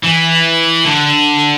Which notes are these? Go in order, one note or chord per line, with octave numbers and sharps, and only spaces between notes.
E3
D3